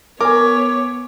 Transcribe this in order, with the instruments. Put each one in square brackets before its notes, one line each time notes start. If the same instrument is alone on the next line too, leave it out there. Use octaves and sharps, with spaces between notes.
[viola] B3 C#5 [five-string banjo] A#4 [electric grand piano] G#5 D6